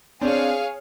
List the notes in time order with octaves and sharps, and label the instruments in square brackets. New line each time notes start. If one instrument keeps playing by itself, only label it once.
[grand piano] C4 D4 [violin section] G#4 C#5 F5